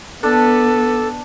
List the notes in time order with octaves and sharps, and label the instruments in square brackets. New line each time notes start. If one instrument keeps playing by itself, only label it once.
[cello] B3 [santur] D4 [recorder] A4